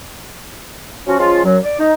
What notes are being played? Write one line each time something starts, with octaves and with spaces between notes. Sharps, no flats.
F3 C#4 F#4
F3 G#3 C#4 F4
F#2 F#3
D5
D#4